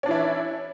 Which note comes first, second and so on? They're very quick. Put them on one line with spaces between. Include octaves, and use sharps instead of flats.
C#4 D4 E3 E4